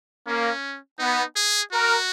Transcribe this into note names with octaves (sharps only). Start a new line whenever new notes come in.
A#3 C#4
B3 D#4
G#4
F#4 A#4